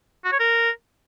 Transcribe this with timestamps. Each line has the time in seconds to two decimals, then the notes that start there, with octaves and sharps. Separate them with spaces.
0.25 F#4
0.32 C#5
0.40 A#4